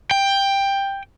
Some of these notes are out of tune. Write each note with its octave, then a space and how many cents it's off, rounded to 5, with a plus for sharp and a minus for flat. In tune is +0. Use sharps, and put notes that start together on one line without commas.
G5 +10